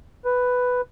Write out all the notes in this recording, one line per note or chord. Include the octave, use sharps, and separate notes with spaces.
B4